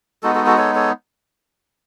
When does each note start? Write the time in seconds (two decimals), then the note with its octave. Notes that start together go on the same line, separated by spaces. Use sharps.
0.23 G#3 B3 D#4 F#4 A4
0.35 F#4 A4
0.46 F#4 A4
0.58 A4 C#5
0.75 A4 C#5